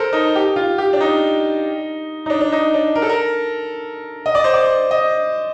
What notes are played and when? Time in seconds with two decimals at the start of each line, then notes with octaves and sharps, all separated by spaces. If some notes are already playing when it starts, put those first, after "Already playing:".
Already playing: A4 A#4 C5
0.13 D#4
0.35 G4
0.56 F4
0.78 G4
0.93 D4
1.00 D#4
2.26 D#4
2.30 D4
2.41 D4
2.52 D#4
2.74 D4
2.95 A#4
3.02 A4
3.09 A#4
4.26 D#5
4.35 D5
4.44 C5
4.54 D5
4.91 D#5